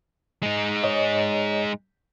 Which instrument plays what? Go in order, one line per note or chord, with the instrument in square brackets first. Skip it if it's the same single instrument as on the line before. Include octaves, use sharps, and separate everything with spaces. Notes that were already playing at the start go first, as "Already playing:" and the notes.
[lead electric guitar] G#3 D#4
[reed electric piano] C#5 D#5